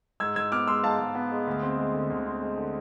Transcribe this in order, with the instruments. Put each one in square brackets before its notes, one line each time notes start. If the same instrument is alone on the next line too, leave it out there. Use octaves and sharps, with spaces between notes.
[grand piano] G#2 E6 G#6
G#2 E6 G#6
B3 D6 F6
G#3 C6 E6
G#2 F5 A5
G#2
B3
G#3
D2
C4
G#3
D3
D2
C4
G#3
D3